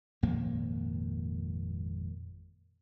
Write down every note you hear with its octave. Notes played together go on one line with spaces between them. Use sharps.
G#1 F2 A#2 A#3